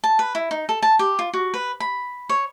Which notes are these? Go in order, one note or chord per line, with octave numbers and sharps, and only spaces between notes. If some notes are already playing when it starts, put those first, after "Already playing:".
A5
B4
E4
D#4
A4
A5
G4
F4
F#4
B4
B5
C#5